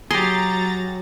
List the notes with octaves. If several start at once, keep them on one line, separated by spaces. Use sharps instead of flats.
F#3 G4 G#4 A#5 C6 A6